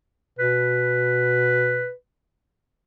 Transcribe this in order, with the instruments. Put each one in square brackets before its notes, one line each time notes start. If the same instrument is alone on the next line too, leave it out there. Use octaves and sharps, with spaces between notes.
[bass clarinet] B2 [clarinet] B4